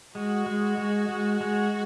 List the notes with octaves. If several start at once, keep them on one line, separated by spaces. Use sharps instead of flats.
G#3 F#4
G#3
G#3
G#3
G#3